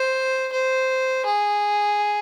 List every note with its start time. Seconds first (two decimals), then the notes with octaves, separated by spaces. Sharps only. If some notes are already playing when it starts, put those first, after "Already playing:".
Already playing: C5
0.52 C5
1.25 G#4